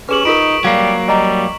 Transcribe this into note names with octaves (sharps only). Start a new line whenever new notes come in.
C#4 G4 G#4 B4 C#6 E7 F#7
D#4 F4 A#4 C#6 B6 D7
F#3 G3 A#3 F5
G3 D#5 A#5